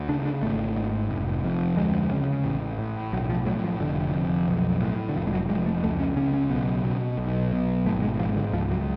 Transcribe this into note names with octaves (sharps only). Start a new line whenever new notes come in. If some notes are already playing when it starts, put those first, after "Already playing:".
Already playing: D2
C#3 D4
D4
G#1 A3
G#2
F1
F2
D2 G#3
C#3
A1
A2
B1 F#3
F3
A2 F#3
F3
F1 D3
F2
B1
A2
D3
F1 F3
G#3
F#3
F2 G#3
A3
C#2 A3
C#4
C#3 C#4
C#4
B1 B3
B2
B1
B2
G#1 A3
G#3
G#2 F3
D3
C#2 F3
F#3